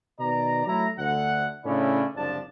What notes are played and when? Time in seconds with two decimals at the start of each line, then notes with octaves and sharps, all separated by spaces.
0.20 B2 D#3 D5 A#5
0.67 F#3 A3 E4 A#5
0.98 D2 D3 F#5
1.65 A2 C#3 C#4 D4 E4
2.16 F#1 C2 F3 D4 A5